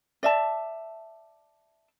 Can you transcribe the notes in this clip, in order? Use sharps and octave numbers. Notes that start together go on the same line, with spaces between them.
D5 E5 A5